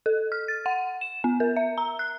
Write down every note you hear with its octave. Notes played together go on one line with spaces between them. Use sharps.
A4
F6
A6
F#5
E7
B3
A#4
E5
A#5
F#6